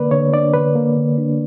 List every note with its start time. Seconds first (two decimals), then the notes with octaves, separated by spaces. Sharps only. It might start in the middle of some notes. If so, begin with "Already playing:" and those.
Already playing: D3 A#3 B4 D5
0.11 D3 C#5
0.32 D4 D5
0.54 D3 B4
0.75 A#3
0.97 D3
1.18 D4